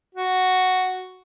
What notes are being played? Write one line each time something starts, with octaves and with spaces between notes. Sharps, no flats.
F#4